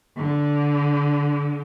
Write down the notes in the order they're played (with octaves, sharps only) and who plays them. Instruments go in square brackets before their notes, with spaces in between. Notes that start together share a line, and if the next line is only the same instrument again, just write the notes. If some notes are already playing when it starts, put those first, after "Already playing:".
[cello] D3